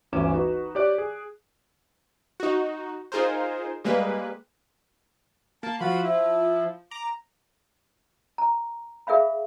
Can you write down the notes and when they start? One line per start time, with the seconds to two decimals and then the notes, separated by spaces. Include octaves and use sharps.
0.12 G1 D2 E3 C#4 D6 E7
0.32 D#4 F#4 B4
0.75 G4 C#5 D5 D6 F#6 D7
0.98 G#4
2.40 D#4 F#4
3.12 D#4 F4 G#4 A#4 C5
3.84 G3 G#3 A#3 B4
5.63 A#3 A5
5.80 F3 F4 F#4 B5
6.03 E4
6.91 A#5 D6
8.38 A#5
9.07 G#4 A#4 E5 F5 B5